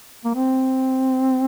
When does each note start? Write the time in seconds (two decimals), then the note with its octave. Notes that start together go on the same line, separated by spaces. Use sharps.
0.25 A#3
0.35 C4